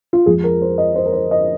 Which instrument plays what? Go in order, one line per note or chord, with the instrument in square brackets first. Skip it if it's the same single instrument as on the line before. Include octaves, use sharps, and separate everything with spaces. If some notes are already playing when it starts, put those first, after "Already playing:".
[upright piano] F4
F2 F3 G#3 G#4
A#4
C5
D#5
C5
A#4
C5
D#5